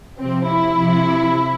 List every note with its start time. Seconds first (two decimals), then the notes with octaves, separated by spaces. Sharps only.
0.18 C3 F3 C4
0.47 E4
0.75 C3 F3